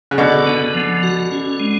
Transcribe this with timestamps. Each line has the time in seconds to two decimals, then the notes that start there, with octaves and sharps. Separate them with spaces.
0.11 C#3
0.18 B2 D3 D4
0.46 B3
0.75 F3
1.03 F#4
1.32 C#4
1.60 G#3